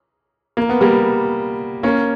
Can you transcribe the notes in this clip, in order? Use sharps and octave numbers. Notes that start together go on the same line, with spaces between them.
A#3
B3
G3 A#3
A#3 C#4